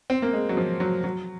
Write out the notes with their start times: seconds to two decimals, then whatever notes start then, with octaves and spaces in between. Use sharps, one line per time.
0.10 C4
0.22 A#3
0.33 G#3
0.49 F#3
0.57 F3
0.80 F#3
1.04 F#3